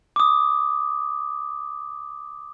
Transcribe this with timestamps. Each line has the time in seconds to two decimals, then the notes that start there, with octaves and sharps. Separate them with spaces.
0.16 D6 D#6